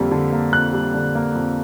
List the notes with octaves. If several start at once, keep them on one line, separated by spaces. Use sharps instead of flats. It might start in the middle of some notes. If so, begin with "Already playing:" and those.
Already playing: F2 D3 G3 A#3
D3
A#3
F2 F#6
G3
D3
A#3
F2